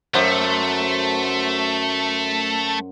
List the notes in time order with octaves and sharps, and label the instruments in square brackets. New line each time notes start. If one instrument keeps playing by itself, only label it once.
[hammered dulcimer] F#2 C5 F#5 [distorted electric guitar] A3